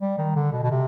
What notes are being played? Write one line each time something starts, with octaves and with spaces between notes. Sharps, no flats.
G3
D#3
D3
B2
B2
C3